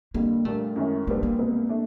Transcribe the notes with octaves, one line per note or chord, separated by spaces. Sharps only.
F2 D3 G3 A#3
A#2 G3 A3 A#3 D4
F#2 D#3 G#3 C#4 E4
A#2 G3 A3 B3 D4
A#3
C2 B2 G#3 B3
A3 D4